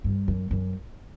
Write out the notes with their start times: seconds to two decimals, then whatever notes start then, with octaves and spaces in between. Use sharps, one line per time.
0.04 G2
0.28 F#2
0.51 F#2